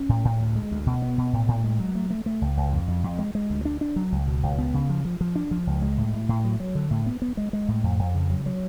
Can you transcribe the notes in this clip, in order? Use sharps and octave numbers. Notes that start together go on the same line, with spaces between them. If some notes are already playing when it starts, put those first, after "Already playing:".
Already playing: C#4
A2
A2
D2
G#3
D2
B2
B3
B2
A2
A2
G#3
F#3
A3
A3
A3
C#2
C#2
F2
F2
F2
G#3
G#3
D2
D4
D4
F#3
C#2
B2
C#2
B3
C#3
F3
F3
F3
D4
F3
C#2
G#3
A2
A2
A2
F#3
F#3
D3
A2
B3
B3
G#3
G#3
A2
F2
F2
C#3
F#3
F#3